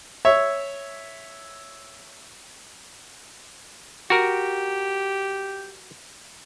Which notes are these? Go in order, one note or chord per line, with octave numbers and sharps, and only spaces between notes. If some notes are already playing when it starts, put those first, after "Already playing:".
C#5 E5
F#4 G4 A#4